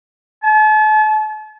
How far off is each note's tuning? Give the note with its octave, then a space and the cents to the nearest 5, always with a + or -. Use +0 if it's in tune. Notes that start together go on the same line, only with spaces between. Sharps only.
A5 -40